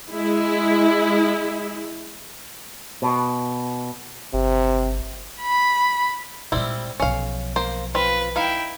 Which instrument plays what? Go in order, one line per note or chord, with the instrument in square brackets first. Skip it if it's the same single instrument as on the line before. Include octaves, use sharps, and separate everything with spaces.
[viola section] G#3 E4
[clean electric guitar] B2
[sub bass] G1 [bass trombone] C3
[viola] B5
[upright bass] A#2 G#3 [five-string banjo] G3 C4 E4
[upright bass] B1 F3 [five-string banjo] C#4 F5
[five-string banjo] A#3 C5
[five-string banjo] C4 F4 [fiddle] B4
[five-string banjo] D#4 F5 [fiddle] E4 G5